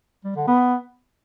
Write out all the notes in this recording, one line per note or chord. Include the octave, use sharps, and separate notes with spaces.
G3
D3
B3